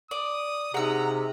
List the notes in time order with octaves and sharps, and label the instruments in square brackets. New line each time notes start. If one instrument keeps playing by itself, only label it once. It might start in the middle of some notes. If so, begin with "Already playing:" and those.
[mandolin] D5 [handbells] D6 [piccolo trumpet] D#6
[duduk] C3 [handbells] D#4 G#4 [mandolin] F#5 E6 [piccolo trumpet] A#5